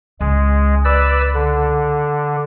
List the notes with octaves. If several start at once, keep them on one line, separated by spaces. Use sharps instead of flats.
C#2 G#3
B4 D5 E6
D3